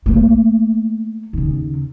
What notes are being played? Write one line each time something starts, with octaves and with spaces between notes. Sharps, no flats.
A3 A#3
D#2 C#3